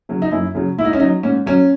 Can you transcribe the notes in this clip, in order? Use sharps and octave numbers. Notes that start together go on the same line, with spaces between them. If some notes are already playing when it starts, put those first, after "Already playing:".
C#3 F#3
D#4
F#2 E4
C#3 F#3
G#2 E4
D#4
C#4
F#3 D#4
G#2 C#4
F#3 C#4